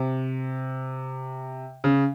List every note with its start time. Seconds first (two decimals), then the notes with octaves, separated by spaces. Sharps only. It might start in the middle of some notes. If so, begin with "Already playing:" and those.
Already playing: C3
1.84 C#3